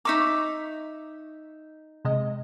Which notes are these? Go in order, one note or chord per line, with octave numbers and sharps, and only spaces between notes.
D#4 E5 A#5 C#6 D6 B6
C3 G#3 D#5